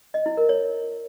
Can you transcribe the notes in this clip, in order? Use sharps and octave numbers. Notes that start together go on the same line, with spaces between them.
D#5
E4
A#4
C#5